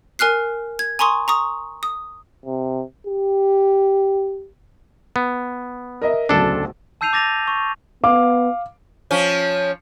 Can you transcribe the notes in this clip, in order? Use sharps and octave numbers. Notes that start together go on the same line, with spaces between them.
A#4 G#5 F6 F#6 C7
G#6
G#5 A#5 C6 C#6 D#6
A#5 C#6 D#6
D#6
C3
G4
B3
A#4 D#5 E5
D1 B1 C#3 D4 A4
A5 E6 G6 C7 D#7 F7
D6 A6 A#6 D#7 F7
C#6
B3 F5 D6
F3 C#4